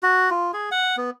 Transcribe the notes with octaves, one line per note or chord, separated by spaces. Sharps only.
F#4
F4
G#4
F#5
B3